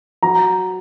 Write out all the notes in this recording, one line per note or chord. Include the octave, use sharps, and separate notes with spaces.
F#3 A#5